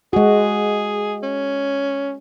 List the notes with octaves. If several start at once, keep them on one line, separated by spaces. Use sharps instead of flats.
G#3 F#4 G#4
C#4